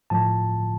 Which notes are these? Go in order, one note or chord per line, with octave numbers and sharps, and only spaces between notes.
A2 F3 A5